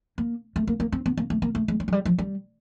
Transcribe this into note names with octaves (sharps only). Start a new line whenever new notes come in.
A#3
A3
A#3
A#3
C4
B3
A#3
A3
A#3
A3
G#3
G#3
F#3
G3
F3
G3